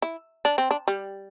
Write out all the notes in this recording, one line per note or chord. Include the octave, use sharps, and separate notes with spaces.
E4
D4
C4
D4
G3